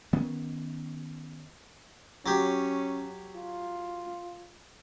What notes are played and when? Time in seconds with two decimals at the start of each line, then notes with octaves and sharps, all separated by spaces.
0.13 D#3 B3 C#4
2.26 F#3 C#4 G4
3.37 F4